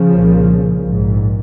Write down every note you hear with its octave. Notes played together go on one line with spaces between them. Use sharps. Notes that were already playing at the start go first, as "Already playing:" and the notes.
Already playing: C#3 F3
C2 A#2
A#1 G#2